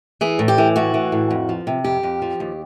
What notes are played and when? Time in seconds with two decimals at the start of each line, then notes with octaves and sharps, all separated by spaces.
0.21 E3 G#4
0.39 A2
0.48 G4
0.58 E3
0.76 A2 F#4
0.94 E3
1.12 A2
1.31 F2
1.49 F3
1.67 C3
1.84 F2 G4
2.03 F2
2.22 F3
2.40 D#2